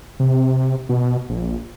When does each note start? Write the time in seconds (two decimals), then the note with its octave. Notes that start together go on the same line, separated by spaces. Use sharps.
0.20 C3
0.89 B2
1.29 A#1